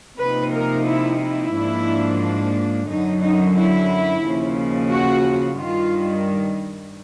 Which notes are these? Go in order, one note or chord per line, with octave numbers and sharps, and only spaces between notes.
C3 F3 A#3 D#4 B4
A#4
E4
E4
G#2 F3 A#3 D4
F#2 D3 F#3 D#4
D#4
E4
D#2 C#3 F3
F#4
G2 D#3 G3 F4